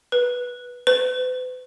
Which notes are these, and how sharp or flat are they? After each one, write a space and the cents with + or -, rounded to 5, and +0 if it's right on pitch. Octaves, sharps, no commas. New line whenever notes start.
B4 -10
B4 +45